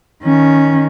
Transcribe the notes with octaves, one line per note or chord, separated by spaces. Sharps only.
D#3 C#4